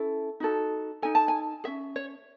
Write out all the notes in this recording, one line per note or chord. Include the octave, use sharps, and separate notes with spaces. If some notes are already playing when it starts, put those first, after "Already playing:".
Already playing: C#4 E4 A4
D#4 F#4 A4
D#4 A4 G#5
A5
G#5
C#4 G#4 E5
C#5